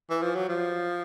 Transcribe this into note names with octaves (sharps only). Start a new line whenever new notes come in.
E3
F3
F#3
F3